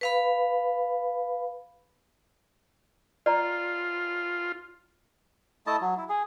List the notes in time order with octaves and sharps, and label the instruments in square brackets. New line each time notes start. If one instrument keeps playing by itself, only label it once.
[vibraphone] B4 F5 B5
[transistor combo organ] F4 [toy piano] D5 A#5
[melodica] A3 E4 D#5 A5
F#3
E4
G#4